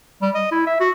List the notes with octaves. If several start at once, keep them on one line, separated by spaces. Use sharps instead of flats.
G3
D#5
E4
E5
F#4